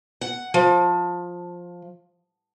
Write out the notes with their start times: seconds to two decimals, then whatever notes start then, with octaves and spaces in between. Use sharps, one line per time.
0.21 F#5
0.54 F3